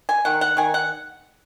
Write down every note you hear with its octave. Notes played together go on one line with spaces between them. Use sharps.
G#5
D#3 F#5
F#5
D#3 G#5
F#5